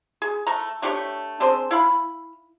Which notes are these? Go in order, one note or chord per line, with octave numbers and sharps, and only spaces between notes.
G#4
A3 A#5
A3 D4 G4 C#5
C4 D4 G#4 C5
E4 F5 B5